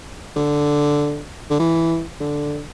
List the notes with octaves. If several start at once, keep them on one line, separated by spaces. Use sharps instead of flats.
D3
D3
E3
D3